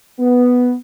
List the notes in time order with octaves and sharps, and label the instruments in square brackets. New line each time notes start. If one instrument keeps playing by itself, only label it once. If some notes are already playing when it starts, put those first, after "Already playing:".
[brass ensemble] B3